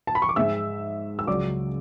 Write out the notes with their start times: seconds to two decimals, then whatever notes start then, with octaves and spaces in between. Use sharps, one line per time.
0.07 A5
0.15 B5
0.22 C#6
0.29 D6
0.36 G#2 G#3 E5 E6
1.19 E6
1.27 C#2 C#3 F#3 D5 D6